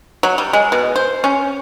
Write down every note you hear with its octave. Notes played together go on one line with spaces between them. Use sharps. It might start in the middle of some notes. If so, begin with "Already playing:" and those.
F#3
G3
G#3
B2
C5
C#4